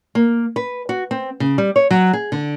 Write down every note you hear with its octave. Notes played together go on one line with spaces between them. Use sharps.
A#3
B4
F#4
C4
C#3
G3
C#5
F#3
G#4
D3